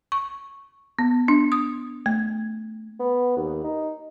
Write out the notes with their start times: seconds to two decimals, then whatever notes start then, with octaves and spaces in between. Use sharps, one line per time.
0.12 C#6
0.99 B3
1.28 D4
1.52 D#6
2.06 A3
3.00 B3
3.37 D#2
3.64 D#4